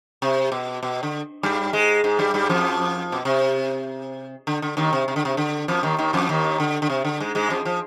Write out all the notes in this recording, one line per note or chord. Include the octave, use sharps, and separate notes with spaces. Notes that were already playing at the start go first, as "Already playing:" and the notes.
C3
B2
B2
D3
G2 G3
G#2 G#3
G#2 G#3
G2 G3
G2 G3
F2 F3
B2
C3
D3
D3
D#2 D#3
C3
C3
D3
C3
D3
F2 F3
D#2 D#3
D#2 D#3
F2 F3
D#2 D#3
D3
D3
C3
D3
G#2 G#3
G#2 G#3
F2 F3
F3